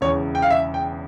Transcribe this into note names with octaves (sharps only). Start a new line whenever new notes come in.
E1 E2 C#3 E3 C#5
G5
F5
E5
G5